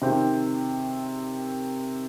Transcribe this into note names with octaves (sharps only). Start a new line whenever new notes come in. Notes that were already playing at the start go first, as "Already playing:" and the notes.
C3 D#3 C4